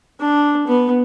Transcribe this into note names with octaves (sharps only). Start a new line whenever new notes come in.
D4
B3